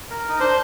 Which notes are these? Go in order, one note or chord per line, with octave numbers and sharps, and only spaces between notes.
A#4
D#4
D4 C5